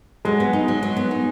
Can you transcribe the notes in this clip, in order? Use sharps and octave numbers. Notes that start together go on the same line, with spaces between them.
F#3 G#3
B3
D#4
F#3
F#3
B3
D#4